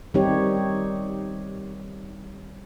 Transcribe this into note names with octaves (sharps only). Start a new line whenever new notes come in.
D#3 G3 C4 D#4 G4 C#5